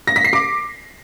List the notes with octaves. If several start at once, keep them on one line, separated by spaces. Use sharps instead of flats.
A#6
B6
C7
D6